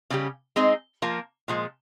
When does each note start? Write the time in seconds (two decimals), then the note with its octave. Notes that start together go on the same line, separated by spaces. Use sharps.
0.10 C#3 G3 C#4 G4
0.56 G#3 C4 D#4 G#4
1.02 F3 A#3 F4 A#4
1.48 A#2 F3 G#3